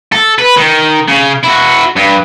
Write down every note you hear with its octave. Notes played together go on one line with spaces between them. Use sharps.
A4
B4
D#3
C#3
E4 F#4
G2